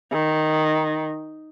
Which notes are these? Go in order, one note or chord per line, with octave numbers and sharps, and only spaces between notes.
D#3